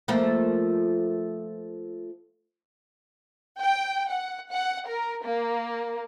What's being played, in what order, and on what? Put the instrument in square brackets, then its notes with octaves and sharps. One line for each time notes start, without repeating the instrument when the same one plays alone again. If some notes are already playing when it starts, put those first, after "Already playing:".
[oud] F3 A3 A#3
[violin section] G5
F#5
F#5
A#4
A#3